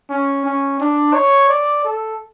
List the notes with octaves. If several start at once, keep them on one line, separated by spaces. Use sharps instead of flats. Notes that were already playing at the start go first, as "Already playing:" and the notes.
C#4
C#4
D4
C#5
D5
A4